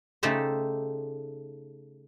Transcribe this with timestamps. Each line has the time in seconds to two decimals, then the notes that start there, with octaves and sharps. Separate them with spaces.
0.23 C#3 A3 D#4 G4 A4 C5